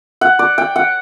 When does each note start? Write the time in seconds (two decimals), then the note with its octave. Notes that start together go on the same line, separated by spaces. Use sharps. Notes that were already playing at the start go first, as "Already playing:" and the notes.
0.21 F#5
0.39 D5
0.58 G5
0.76 F#5